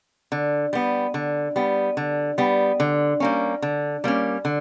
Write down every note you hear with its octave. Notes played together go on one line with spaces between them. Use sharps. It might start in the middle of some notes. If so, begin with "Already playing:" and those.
D3
G3 B3
D3
G3 B3
D3
G3 B3
D3
G3 A#3 C#4
D3
G3 A#3 C#4
D3